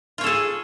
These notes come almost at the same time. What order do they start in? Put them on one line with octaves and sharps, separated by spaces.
F4 C#5 A4 G#4